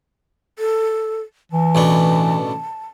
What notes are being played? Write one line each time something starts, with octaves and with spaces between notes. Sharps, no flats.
A4
E3 A5
A1 B2 D4